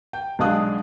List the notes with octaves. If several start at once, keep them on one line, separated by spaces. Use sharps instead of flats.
G5
B1 G#3 D4 F5 D#6 F#6